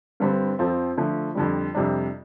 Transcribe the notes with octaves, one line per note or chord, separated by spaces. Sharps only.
G2 D3 G3 C4
F2 F3 C4 F4 A4
D3 F3 A3
F2 D3 G3
F2 C3 G3 D4